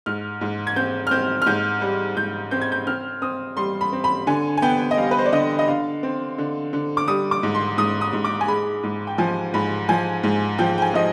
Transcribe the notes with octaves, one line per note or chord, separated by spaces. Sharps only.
G#2 F6
G#2
G#6
C4 G6
F6
C4 G6
F6
G#2 G6
G3
G#2 G6
C4 G6
G#6
G6
C4 F6
C4 D#6
G3 C6
B5
C4
B5
D3 G#5
G#5
B3 G5
D#5
G3 F5
B4
C5
D5
D3 D#5
D#5
D3 F5
C4
D3
D3
D6
G3 D#6
D6
G#2
C6
G#2 D#6
D#6
G#2
D6
G#5
G#3 B5
G#2
G5
F3 G#5
G#2 B5
F3 G#5
G#2
F3 G5
G5
G#5
F3 D#5